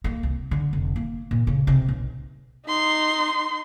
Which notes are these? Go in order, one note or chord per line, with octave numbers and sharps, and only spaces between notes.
A#3
C2
D3
F1
A#3
A#2
C#3
C3
B1
D#4 C6